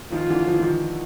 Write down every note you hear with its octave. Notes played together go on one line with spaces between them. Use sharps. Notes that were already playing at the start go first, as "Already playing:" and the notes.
D#3 F3 F4
D3 E3
F3
E3
D#3 F3